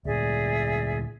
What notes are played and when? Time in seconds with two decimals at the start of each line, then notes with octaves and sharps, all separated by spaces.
0.05 D2 A#2 G#4 D5 E5